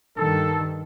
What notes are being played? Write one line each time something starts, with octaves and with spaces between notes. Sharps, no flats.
G2 D#3 A4